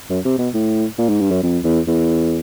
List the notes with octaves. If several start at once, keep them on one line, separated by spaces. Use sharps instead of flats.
F#2
C3
B2
A2
A#2
G#2
G2
F#2
F2
E2
E2